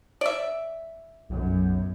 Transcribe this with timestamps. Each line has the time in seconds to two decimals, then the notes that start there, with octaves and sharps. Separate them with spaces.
0.21 D5 E5
1.29 B1 F#2 B2